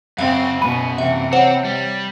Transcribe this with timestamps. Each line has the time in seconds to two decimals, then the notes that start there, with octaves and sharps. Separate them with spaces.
0.18 F#2 C#3 C4 F5
0.62 B2 B5 D#7
0.98 C3 E3 E5
1.33 C4 C5 C#5 F#5
1.65 G3